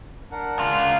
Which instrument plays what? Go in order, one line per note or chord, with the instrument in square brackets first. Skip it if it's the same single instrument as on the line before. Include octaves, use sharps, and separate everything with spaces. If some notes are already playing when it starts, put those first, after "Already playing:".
[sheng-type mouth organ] D4 A#4 F#5
[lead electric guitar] C#2 F4